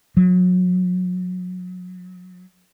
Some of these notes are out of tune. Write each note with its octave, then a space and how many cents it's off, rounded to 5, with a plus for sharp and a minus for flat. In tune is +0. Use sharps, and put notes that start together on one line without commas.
F#3 -30